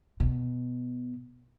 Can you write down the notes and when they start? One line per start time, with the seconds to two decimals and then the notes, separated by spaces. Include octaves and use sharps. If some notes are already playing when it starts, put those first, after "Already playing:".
0.20 B2